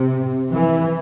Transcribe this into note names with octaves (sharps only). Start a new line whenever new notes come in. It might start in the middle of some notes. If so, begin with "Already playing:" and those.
Already playing: C3
E3